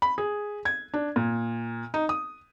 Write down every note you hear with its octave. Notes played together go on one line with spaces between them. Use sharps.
B5
G#4
G#6
D4
A#2
D#4
D#6